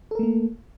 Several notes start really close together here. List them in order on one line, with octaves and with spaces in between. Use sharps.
A4 A#4 A3 A#3